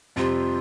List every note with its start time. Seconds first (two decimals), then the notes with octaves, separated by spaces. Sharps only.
0.16 F2 C3 G3 C4 F4